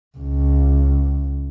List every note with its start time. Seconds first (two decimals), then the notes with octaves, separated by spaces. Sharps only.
0.17 C#2